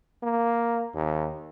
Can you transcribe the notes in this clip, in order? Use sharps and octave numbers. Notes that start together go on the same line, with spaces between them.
A#3
D#2